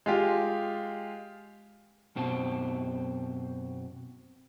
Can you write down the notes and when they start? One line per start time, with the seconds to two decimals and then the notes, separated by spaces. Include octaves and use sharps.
0.06 G#3 F4 G4
2.16 F#2 B2 C4 A5